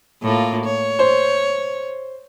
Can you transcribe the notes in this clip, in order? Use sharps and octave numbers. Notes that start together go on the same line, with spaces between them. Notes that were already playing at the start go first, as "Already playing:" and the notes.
A2 A#3 F4
C#5
C5